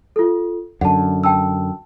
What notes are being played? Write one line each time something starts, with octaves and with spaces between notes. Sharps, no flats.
F4 A4
F#2 D3 F#5 A5
G5 A5 E6